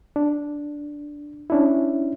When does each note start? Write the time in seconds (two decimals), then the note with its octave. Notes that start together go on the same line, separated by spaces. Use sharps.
0.16 D4
1.50 C#4 D4 E4